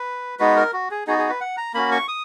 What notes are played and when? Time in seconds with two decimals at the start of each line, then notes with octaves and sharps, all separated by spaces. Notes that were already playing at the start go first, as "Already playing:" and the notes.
Already playing: B4
0.39 G#3 B3 D#4 F#4 B4
0.56 A#4
0.73 F#4
0.91 G#4
1.07 B3 D#4 F#4 G#4
1.18 G#4
1.30 B4
1.41 F#5
1.57 A#5
1.74 A#3 C#4 F#4 B5
1.91 C#6
2.08 D#6